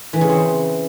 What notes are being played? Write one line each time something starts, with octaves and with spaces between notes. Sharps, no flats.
E3
C#3
C4